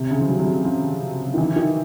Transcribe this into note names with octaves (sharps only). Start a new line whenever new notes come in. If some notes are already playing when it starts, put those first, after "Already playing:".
Already playing: C3
C#3
F3
F#3
F#3
F3
F3
D#3
E3
D#3